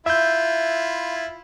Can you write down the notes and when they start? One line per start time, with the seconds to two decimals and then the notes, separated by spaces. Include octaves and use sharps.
0.06 E4 F4 E5 G6